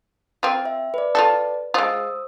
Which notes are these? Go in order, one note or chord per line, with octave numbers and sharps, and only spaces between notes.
C4 F4
E5
B4 D5
F4 F#4 A4
G#3 F4 C5 D#6 E6